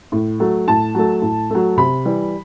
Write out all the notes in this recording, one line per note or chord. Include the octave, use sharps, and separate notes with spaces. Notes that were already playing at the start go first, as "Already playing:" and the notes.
A2
F#3 A3
A2 A5
F#3 A3
A2
F#3 A3
C3 B5
E3 G3